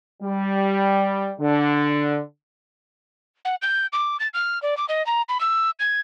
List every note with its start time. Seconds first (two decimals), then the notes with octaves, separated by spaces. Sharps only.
0.22 G3
1.40 D3
3.45 F#5
3.62 G6
3.93 D6
4.20 A6
4.34 F6
4.62 D5
4.77 D6
4.89 D#5
5.06 A#5
5.29 B5
5.40 E6
5.79 G#6